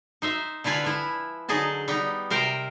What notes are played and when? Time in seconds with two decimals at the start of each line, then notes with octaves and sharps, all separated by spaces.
0.22 D#4 C5 E5
0.64 D3 E4 F4 B4 G#5
0.84 F3 E4
1.49 D3 F#3 D#4 G#4 D#5 A5
1.88 G3 B3 D#4
2.30 C3 A#4 C5 G5